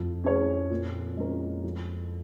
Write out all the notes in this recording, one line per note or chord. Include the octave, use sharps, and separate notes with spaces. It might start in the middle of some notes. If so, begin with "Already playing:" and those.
Already playing: F2 F3
C#4 G#4 C#5
A#2
G#3 C#4 A#4
F3